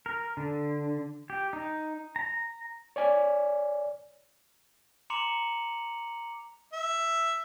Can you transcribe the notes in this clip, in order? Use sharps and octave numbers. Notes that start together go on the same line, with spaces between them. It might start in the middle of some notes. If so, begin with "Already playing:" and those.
A#4
D3
G4
D#4
A#5
C#5 D5 G#5
A#5 C6 D6 C#7 F7 F#7
E5